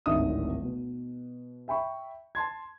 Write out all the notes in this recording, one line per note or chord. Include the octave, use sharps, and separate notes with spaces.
D1 G#1 D4 D#4 E5 D#6
B2
E5 G5 B5 C#6
A5 C6 G#6